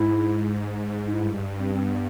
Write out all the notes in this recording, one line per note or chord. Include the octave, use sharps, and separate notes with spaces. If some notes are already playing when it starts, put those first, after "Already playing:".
Already playing: G#2 E4
D#4
G2 E4
C4
C4
B3